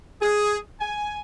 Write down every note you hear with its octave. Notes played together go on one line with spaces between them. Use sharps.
G#4
G#5